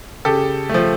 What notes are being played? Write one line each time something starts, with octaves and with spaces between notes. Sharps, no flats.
C#3 G4 A4
F3 A3